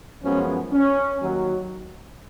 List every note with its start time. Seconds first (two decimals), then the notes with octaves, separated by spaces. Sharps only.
0.23 F#2 F3 G#3 B3 C#4
0.72 C#4
1.21 D#2 D#3 F#3